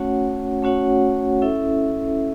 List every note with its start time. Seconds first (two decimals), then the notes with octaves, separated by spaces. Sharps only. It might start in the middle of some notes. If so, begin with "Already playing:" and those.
Already playing: A3 C#4 F#4 C#5 F#5
0.63 A3 C#4 F#4 C#5 F#5
1.42 C#4 E4 A4 E5